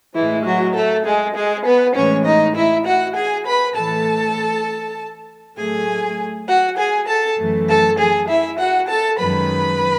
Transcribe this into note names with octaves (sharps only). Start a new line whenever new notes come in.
A2 E3 G#3 E4
F#3 F#4
A3 A4
G#3 G#4
G#3 G#4
B3 B4
A2 E3 G#3 C#4 C#5
D#4 D#5
E4 E5
F#4 F#5
G#4 G#5
B4 B5
A2 E3 A3 A4 A5
A2 F#3 A3 G#4 G#5
F#4 F#5
G#4 G#5
A4 A5
F#2 E3 A3
A4 A5
G#4 G#5
E4 E5
F#4 F#5
A4 A5
F#2 D#3 G#3 B4 B5